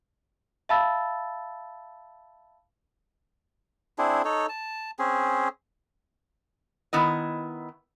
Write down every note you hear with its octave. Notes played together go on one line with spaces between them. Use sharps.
E5 F5 A5 B5 E6 A6
C4 D4 E4 G#4
D#4 A4 C#5
A5
C4 C#4 G#4
D#3 B3 E4 D#5